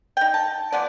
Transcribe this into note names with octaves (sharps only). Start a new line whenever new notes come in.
D#4 G5
A5
F3 B3 D5